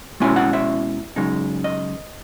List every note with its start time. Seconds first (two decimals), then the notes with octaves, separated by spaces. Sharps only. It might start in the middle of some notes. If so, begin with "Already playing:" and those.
0.20 B2 G#3 C#4 E4 G#5
0.36 F#5
0.53 E5
1.16 F#2 C#3 G#3 D#4
1.64 D#5